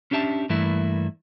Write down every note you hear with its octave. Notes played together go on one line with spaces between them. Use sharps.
C#4 D4 G4 E5 A5
G2 E3 A3 A#3 E4